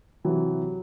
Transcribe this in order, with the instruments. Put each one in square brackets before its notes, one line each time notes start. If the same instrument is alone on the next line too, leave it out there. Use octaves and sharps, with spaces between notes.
[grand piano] C3 E3 F#3